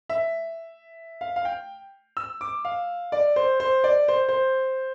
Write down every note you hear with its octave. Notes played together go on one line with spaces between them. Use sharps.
E5
F5
F5
G5
E6
D6
F5
D5
C5
C5
D5
C5
C5